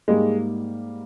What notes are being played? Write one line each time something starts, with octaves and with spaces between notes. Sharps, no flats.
G#2 G3 G#3 A#3 D#4